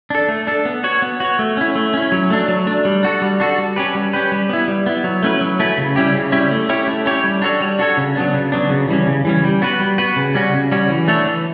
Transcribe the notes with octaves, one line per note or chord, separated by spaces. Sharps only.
D4 A4
A3
D4 A4
B3
F#4 C#5
B3
F#4 C#5
A3
C#4 E4
A3
C#4 E4
F#3
A3 D4
F#3
A3 D4
G3
D4 F#4 A4
G3
D4 F#4 A4
G3
C#4 G4 B4
G3
C#4 G4 B4
G3
B3 E4
G3
B3 E4
F#3
A3 C#4 E4 B4
F#3
A3 C#4 E4 B4
C#3
G3 C#4 E4 G4
C#3
G3 C#4 E4 G4
A3
C#4 E4 G4 C#5
A3
C#4 E4 G4 C#5
G3
D4 F#4 A4 C#5
G3
D4 F#4 A4 C#5
C#3
F#3 B3 D4
C#3
F#3 B3 D4
C#3
E3 G3 C#4
C#3
E3 G3 C#4
G3
B3 F#4 B4
G3
B3 F#4 B4
C#3
G3 C#4 F#4
C#3
G3 C#4 F#4
E3
A3 D4 A4 C#5
E3